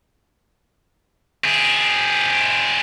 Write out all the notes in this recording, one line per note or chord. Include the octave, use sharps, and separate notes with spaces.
C4 G#4